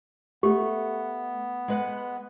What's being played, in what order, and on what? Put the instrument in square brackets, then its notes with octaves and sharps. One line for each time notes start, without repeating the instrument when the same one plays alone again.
[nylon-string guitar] A3 [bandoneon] B3 [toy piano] G4
[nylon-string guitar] G#3 B4 F#5